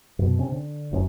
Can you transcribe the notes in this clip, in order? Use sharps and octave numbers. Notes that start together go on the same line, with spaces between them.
F#2 B2
C3 C4 C#4
D3
F1 F#2 C4 C#4